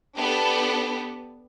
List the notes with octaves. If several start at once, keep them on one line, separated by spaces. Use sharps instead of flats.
B3 D4 G4 A4 B4